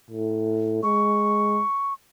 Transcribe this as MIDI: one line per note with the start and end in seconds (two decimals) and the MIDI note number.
0.11 0.81 45
0.83 1.62 56
0.83 1.93 85